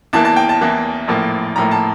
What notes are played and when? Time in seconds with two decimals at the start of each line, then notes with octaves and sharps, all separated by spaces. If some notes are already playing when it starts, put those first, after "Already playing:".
0.13 E2 E3 A#3 A5
0.25 A5
0.36 G5
0.49 A5
0.61 E2 E3 A#3
1.08 A#1 A2 F3 A#3
1.56 A#1 A2 F3 A#3 A#5
1.71 A5